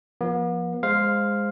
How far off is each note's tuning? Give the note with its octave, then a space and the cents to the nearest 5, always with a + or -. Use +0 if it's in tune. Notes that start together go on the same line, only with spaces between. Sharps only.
F3 +5 B3 -45
G#3 -10 C5 +0 F5 +0